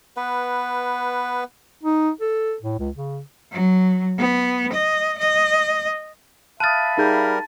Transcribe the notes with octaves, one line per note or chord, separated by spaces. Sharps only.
B3 B4
D#4
A4
A2
C#2
C#3
F#3
B3
D#5
D#5
E5 F5 A5 B5 D#6 F6 F#6 A6
G3 D#4 G#4 A#4 G6